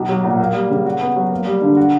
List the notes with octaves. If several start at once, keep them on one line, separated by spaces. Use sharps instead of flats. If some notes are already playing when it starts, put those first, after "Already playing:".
Already playing: B1
F#3
A#2
A#3
G3
C#3
F#4
B3
F#3
A#3
G3
D3
F#4